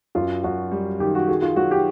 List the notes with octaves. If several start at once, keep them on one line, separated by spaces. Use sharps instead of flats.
F#2 F4
F#2 F#4
G3
D#3 G4
F#4
F#4 G#4
F4
F#3 F#4
G4